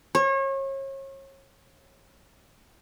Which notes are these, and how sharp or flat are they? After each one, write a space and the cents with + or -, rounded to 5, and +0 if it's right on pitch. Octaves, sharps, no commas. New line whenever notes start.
C#5 -35